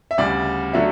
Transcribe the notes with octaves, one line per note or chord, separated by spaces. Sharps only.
E5
D2 C#3 G3 D5
D3 F#3 A3 E5